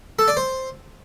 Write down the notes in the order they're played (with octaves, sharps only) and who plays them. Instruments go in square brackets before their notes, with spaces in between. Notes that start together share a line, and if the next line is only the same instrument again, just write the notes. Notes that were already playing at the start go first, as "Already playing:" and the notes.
[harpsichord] A4
D5
C5